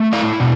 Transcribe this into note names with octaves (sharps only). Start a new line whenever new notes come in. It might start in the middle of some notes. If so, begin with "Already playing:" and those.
Already playing: A3
E4 D5 F5
B2